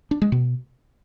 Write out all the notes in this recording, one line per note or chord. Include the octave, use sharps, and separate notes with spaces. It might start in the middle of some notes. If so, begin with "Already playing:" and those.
D4
G#3
B2